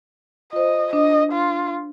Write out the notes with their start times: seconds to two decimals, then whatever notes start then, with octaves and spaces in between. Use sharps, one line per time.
0.53 F4 C5 D#5
0.93 D4 D#5
1.32 F4